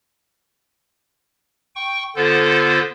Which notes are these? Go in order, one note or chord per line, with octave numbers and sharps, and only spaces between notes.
G5 C#6
D3 B3 F4 A4 C5